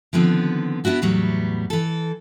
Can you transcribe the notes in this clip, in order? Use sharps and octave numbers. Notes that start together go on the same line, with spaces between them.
D3 D#3 F3 B3 C4
B3 D4 E4 F#4 A4
E2 A2 F#3 G3 B3
E3 A4